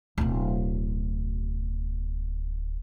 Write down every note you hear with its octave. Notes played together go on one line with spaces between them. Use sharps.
D1 B2